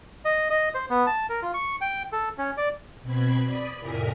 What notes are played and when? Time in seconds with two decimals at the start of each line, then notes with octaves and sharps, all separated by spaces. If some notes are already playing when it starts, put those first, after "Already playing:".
0.25 D#5
0.50 D#5
0.74 C5
0.90 B3
1.07 A5
1.29 A#4
1.42 F4
1.54 C#6
1.81 G5
2.12 A4
2.38 C#4
2.57 D5
3.02 B2 C4 B5 G#6
3.45 D5 B5 D#6
3.78 F2 A2 C3 A#4 G#5 B6